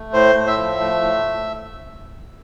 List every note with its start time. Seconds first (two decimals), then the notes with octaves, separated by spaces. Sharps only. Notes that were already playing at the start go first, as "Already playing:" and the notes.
Already playing: A3
0.13 A2 C5
0.35 A2
0.47 E5
0.58 F3
0.80 A3
1.02 A2